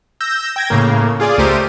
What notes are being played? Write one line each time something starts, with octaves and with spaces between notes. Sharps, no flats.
E6 G6 A#6
G5 G#6 A#6
A2 C#3 A#3
F4 G#4 D5
C#2 A3 G4 A#4 C5 D#7